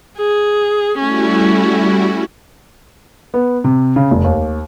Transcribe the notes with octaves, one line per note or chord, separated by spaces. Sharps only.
G#4
G3 A3 C#4 E4 F#4
B3
C3
C#3
F1
D#2